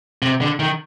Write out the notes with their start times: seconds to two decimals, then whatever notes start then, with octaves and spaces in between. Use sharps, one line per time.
0.22 C3
0.41 D3
0.59 D#3